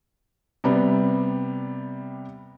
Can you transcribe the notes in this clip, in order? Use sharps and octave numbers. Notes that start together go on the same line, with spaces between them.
C3 G3 B3